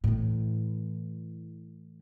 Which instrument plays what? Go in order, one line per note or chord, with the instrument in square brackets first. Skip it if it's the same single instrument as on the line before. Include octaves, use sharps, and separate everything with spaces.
[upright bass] A2 E3